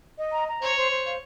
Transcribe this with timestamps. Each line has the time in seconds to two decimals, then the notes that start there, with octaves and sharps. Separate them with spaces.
0.18 D#5
0.32 A#5
0.47 A#5
0.61 C5 C#5
0.76 C5
0.91 C5
1.05 F5